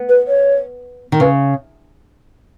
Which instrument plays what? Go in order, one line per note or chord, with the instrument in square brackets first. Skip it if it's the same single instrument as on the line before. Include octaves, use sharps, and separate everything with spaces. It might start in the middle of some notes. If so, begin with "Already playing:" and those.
Already playing: [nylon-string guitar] B3
[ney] B4
C#5
[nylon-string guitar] D#3
[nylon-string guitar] C#3 [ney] B4